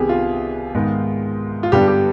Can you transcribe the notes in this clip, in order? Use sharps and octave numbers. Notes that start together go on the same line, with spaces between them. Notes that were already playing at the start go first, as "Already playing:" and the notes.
Already playing: C2 C3 D#3 B3 G4 G#4
F4
G#2 D#3 G#3 B3
F4
G2 D3 G3 B3 D4 G4
G4